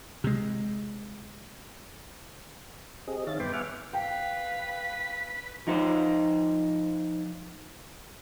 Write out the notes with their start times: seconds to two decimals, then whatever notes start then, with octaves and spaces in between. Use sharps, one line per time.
0.24 C3 G#3
3.08 C4 G4 G#4 D#5
3.27 D#3 C#5 E5 F5 A6
3.40 G2 B3 G5 B5 C6 D6
3.53 E5 F#5 G#5 C#6 D6 F6
3.93 B4 F5 G5 B6
5.67 F3 D#4 F4 C5